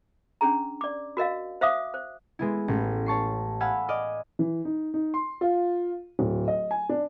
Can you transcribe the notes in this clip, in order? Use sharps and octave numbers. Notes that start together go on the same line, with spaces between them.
C#4 D4 G#4 A#5
D5 D6
F#4 A#4 D#5 F5
C5 E5 F5 D6 D#6
C5
G#3 B3 E4
A1
C#5 A5 C#6 C7
F5 F#5 G#5 B5 E6 F6
D5 D#5 F6
E3
D#4
D#4
C6
F4
D1
D#5
G#5
D4